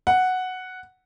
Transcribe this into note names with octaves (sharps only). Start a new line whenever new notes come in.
F#5